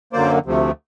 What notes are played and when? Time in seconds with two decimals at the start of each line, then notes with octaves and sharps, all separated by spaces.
0.13 F#2 D3 F#3 A#3 C5 D5
0.46 D2 C3 F3 A3